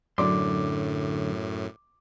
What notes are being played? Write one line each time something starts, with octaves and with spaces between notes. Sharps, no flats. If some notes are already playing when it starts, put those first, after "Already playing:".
F#2 A2 D3 F#3 D5 C6 D6